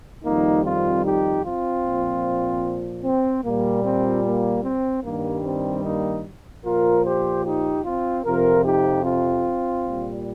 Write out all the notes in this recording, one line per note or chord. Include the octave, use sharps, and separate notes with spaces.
F2 D#3 G3 A#3 D#4
C4 F4
D#4 G4
C4 F4
A#2 F3
C4
A#2 G3 A#3
C4
A#3
C4
G2 D#3 G3 A#3
C4
A#3 D#4
A#2 F3 F4 A#4
G4 C5
D#4 G4
C4 F4
F2 C3 F3 F4 A#4
D#4 G4
C4 F4
A#2 G3